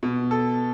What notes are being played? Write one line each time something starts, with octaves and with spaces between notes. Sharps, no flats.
B2
A4